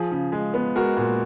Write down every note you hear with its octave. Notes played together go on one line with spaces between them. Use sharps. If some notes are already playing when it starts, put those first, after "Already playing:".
Already playing: F3 G#4
C#3
G#3
B3
G#3 F#4 A#4
A#2